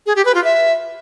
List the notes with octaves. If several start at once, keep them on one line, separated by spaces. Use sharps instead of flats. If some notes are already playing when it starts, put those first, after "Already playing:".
G#4
G4
B4
F4
E5